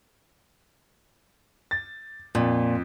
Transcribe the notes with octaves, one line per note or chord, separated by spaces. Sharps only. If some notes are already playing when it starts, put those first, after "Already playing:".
A6
F2 A#2